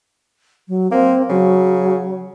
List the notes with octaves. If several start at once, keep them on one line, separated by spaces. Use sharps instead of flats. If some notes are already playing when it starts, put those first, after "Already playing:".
F#3
A#3 C4
C#3 F#3